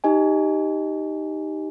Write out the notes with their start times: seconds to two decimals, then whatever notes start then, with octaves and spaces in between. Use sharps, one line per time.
0.04 D#4 G4 D#5 G#5